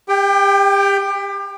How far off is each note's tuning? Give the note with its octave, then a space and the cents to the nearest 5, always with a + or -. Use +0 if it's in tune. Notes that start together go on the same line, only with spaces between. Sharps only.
G4 +35 G5 +0